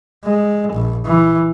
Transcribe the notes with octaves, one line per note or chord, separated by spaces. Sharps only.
G#3
A#1
E3